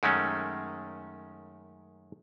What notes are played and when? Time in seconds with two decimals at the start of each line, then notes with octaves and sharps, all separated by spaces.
0.03 F#2 D#3 G#3 A3 C#4